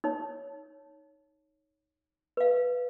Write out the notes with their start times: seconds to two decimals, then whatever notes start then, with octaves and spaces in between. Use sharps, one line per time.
0.04 D#4 C#5
2.37 B4 F5